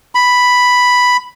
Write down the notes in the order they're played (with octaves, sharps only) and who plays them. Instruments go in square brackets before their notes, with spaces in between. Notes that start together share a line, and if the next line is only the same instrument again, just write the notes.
[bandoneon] B5